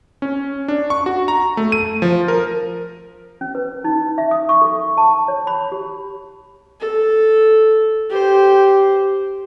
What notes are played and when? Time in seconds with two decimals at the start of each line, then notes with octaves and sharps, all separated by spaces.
0.22 C#4
0.68 D4
0.90 C#6
1.06 F#4
1.28 A#5
1.57 A3
1.72 D#7
2.02 F3
2.28 A#4
3.41 C#4
3.55 B4
3.84 D#4
4.18 E5
4.31 D#6
4.49 C#6
4.62 A4
4.97 A5
5.28 C#5
5.47 B5
5.72 G4
6.80 A4
8.10 G4 C5